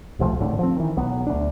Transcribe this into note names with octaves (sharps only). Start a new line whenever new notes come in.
E1 C2 F3 A3
G#1 A2 D3
F3 C4
D#3 E3
B1 F#3 B3
D2 D4